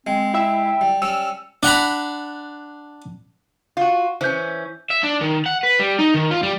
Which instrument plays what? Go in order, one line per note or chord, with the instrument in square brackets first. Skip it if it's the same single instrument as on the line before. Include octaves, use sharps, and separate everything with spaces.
[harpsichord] G#3 [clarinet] C4
[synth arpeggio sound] E4 E5 [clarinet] G5
[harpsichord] G3
[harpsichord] G3 C#4 [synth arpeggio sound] E6
[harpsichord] D4 F#5 A#5 B5
[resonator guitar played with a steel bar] F4 F#4
[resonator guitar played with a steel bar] E3 C#4 [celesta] C5 G6
[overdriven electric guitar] E5
D4
D#3
F#5
B4
G3
D#4
D#3
F4
G3